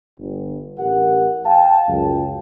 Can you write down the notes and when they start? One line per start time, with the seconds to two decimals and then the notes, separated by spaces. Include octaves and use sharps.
0.19 G1
0.79 A1 G4 A#4 F#5
1.46 F5 G5 A5
1.88 C#2 F#2